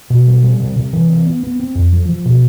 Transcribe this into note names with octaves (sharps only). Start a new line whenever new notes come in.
B2
G3
G3
C3
C3
E3
C4
B3
B3
C4
F2
F3
F3
B2